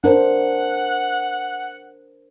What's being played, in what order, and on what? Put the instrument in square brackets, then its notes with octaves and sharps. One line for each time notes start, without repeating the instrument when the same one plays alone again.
[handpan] D4 A#4 C5 [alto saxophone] F#5